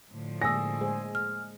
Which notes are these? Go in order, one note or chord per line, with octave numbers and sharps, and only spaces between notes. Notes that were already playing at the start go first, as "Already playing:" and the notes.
A2 D3 F3
G#3 A#3 D5 G#5 D#6 E6 A#6
G#3 G#4 C5
F6